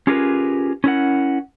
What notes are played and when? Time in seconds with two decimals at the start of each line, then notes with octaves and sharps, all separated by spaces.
0.07 C#4 F4 G4 G#4 A#4 B4
0.84 C#4 E4 A#4 F#5